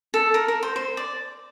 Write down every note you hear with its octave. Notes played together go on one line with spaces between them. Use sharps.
A4
A#4
A#4
C5
C5
D5